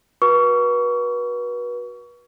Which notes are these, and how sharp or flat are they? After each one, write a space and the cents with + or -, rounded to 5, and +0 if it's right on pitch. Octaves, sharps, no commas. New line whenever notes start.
F#4 +0 B4 -35 C#6 +30